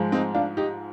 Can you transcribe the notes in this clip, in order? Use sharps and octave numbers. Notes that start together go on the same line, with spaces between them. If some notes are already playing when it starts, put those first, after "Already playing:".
Already playing: G#2 F3 G#3
C4 D#4
D4 F4
D#4 G4